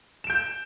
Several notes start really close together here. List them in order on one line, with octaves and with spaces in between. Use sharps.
E7 D7 G6